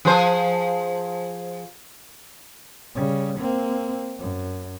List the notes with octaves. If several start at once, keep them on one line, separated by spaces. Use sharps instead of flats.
F3 G#4 C5
C#3 G3
A#3 C4
F#2